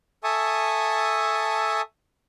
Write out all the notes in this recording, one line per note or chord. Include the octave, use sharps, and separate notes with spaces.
A4 E5 G#5 A5 C#6 D#6